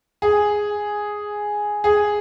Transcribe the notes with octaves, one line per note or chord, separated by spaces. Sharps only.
G#4
G#4